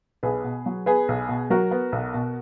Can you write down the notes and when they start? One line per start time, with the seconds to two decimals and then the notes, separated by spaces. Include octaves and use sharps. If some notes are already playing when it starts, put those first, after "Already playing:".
0.23 B1 G#4 B4
0.44 B2
0.66 F#3
0.86 B3 G#4 B4
1.08 B1
1.29 B2
1.50 F#3 F#4 A#4
1.71 B3
1.92 B1
2.14 B2